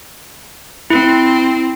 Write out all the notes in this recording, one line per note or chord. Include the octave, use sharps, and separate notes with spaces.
C4 E4